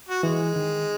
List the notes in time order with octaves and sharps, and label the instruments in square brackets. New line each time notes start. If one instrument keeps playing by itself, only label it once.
[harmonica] F#4
[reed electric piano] E3 [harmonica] G#3
[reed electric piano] D#3